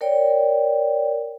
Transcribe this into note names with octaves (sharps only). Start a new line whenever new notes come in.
A#4 C#5 D5 G5